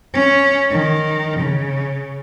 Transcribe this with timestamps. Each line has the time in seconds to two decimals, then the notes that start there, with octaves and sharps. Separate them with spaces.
0.14 C#4
0.71 D#3
1.40 C#3